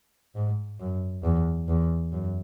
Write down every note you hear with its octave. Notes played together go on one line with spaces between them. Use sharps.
G#2
F#2
E2
E2
F#2